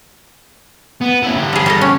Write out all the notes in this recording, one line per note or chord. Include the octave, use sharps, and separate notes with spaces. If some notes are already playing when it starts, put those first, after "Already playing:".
B3
C#4 E4
D3 G4
G3 G#4
G3 A4 D#5
C#4